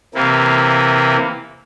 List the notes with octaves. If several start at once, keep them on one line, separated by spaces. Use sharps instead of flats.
C3 E3 A#3